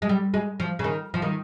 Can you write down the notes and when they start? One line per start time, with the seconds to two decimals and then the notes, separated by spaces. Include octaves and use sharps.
0.02 G#3
0.09 G3
0.34 G#3
0.60 F3
0.79 C#3
0.84 D#3
1.14 F3
1.22 D#3